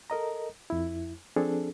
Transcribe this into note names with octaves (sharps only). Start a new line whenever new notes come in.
A4 A#4 D#5 A#5
F2 E4
F3 C4 D4 G#4 A4